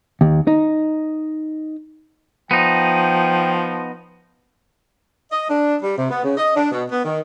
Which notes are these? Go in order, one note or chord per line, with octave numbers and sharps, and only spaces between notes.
D#2
D#4
F3 B3 D#4 G5
D#5
D4
G3
C3
B3
C#3
D#5
D4
B2
B3
D#3